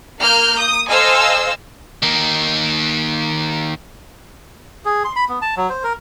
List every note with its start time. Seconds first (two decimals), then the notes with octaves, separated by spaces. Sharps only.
0.21 A#3 F6 G6
0.60 D#6
0.90 A4 C5 D#5 F5 G#5 E6
2.03 D#3 A#3
4.85 G#4
5.05 C6
5.16 B5
5.29 B3
5.42 A5
5.57 F#3
5.70 C5
5.84 A#4